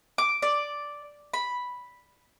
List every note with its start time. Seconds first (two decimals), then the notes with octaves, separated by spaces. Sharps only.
0.18 D6
0.42 D5
1.34 B5